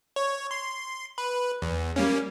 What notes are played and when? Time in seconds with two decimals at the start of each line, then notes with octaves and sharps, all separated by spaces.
0.16 C#5
0.51 C6
1.18 B4
1.62 E2
1.96 G3 A#3 C#4